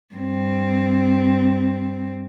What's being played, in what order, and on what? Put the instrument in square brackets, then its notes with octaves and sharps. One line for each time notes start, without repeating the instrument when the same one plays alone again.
[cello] G2 C4